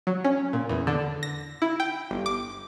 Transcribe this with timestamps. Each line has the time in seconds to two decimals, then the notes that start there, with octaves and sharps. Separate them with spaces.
0.07 F#3
0.25 C#4
0.53 A#2
0.69 E2
0.87 D3
1.23 A#6
1.62 E4
1.80 G5
2.11 G1
2.26 D6